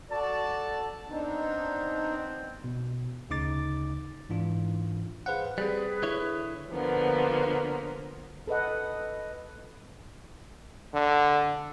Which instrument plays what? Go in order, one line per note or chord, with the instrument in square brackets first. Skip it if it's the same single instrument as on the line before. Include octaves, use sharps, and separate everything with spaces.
[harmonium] F#4 D5 [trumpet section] A4 A5
[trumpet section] B3 C4 [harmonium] D4 D#4
[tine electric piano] B2
D2 C#3 D#4 D6 A6
G#2 E3 D4 F4
G#4 B4 C5 F5 F#5
[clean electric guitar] G3 C4 [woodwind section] G#4 B4
[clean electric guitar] D3 E4 C#5
[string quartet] D3 F3 A#3 B3
[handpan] A4 B4 D#5 F#5
[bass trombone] D3